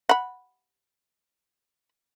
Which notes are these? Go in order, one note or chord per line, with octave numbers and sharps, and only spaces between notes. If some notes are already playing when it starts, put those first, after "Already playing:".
F#5 B5